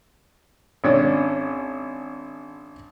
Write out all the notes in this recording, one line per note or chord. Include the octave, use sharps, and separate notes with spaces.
G#1 C#4 D4